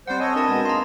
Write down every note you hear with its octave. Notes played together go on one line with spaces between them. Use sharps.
G3 C4 C5 F#5
A4 C#5 D#5 G#5
D4 E4 A#4 A5
B2 G#3 B3 G#6
A#3 D#4 G#4 A#5 C6